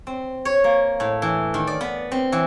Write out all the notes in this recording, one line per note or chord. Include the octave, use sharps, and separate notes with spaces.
C4
C#5
A#3
A2
E3
D#3
D5
B3
C4
E3